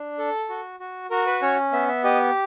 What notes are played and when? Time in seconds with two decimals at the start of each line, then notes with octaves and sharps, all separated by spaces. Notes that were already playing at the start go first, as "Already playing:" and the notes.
Already playing: D4
0.18 A4
0.49 F#4
0.80 F#4
1.10 F#4 A#4
1.26 B4
1.42 C#4 C#5
1.72 B3 E5
1.88 E5
2.04 G4 D#5